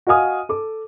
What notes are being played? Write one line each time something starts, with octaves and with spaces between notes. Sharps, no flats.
F#4 D#5 F5 G#5 D#6 F6
A4 D6